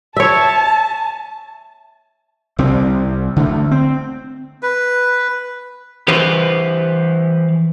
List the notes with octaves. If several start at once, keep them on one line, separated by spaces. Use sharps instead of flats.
C#5 E5 A5
C2 G3 C4
D3 A3
C4
B4
E3 G4 B4 C5